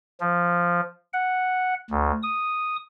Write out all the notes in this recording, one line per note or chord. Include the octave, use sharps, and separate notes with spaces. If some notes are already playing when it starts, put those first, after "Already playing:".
F3
F#5
D2
D#6